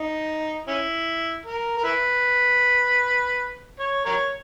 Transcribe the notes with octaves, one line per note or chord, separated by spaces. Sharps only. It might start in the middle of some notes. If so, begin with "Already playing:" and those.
Already playing: D#4
C#4 E4
A#4
A#4
E4 B4
C#5
A#4 C#5